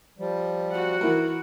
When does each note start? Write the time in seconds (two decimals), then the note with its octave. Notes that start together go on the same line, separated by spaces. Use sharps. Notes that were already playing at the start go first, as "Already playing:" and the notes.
0.19 F3 G3
0.71 F#4 F#5
1.01 E3 E4 A#4